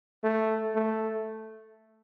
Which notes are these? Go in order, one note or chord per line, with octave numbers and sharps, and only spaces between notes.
A3
A3